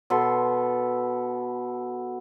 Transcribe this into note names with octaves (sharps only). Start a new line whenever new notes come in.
B2 A4 B4 C6